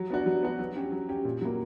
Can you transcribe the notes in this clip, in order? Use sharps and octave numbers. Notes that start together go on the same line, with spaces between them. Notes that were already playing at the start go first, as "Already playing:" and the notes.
Already playing: F#3
B3 D4 F#4
F#3
B3 D4 F#4
F#3
C#4 G4
F#3
C#4 G4
A#2
F#3 A#3